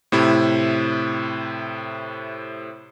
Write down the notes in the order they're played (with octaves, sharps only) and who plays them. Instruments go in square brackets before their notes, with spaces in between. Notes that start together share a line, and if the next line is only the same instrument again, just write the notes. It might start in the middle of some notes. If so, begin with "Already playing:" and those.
[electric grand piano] A2 C3 E4